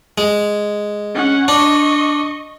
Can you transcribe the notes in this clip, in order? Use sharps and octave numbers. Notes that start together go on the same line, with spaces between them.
G#3
C#4 F#5
D4 D#5 C#6